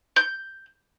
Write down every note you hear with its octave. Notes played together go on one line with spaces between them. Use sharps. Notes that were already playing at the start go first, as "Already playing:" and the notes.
G6